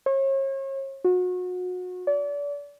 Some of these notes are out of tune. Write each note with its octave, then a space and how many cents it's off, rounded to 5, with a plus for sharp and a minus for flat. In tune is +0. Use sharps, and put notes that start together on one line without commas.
C#5 -40
F#4 -30
D5 -35